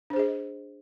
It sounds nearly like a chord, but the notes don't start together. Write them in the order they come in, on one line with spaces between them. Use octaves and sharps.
D4 C5 G#4 D#5